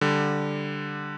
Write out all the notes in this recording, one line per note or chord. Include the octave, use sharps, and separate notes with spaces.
D3 G3